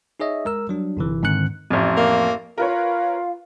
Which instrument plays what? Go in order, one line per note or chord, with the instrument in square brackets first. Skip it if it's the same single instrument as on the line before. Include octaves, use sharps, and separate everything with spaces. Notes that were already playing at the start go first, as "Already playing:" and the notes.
[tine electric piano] D#4 G#4 C#5 D#5 E5
G#3 A#4 E6
F#3 G3 D4
G1 C3 E3
G#2 D3 D#3 C4 F#6 C#7
[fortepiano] A1 F2
[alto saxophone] A#3
[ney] F4 [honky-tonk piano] A#4 B4 C#5 [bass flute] F5